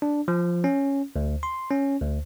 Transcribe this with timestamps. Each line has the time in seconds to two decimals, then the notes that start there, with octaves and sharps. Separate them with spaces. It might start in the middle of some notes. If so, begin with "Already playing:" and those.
0.02 D4
0.28 F3
0.64 C#4
1.16 D2
1.43 C6
1.70 C#4
2.02 D2